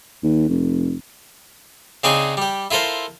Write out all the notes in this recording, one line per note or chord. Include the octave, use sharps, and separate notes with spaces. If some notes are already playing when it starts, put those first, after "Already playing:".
D#2
F1
C#3 C4 D4 D#4 G#4 C#6
G3 G4
E4 F4 A4 A#4 C5